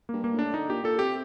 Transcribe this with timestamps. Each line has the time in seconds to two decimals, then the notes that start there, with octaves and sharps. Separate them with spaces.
0.09 G2 A#3
0.24 A#3
0.34 A2 D4
0.54 D3 D#4
0.69 A#2 G4
0.84 A#2 A4
0.99 C3 G4